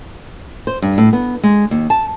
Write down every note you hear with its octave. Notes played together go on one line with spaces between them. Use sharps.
C5
G2
A2
B3
G#3
D#2
A5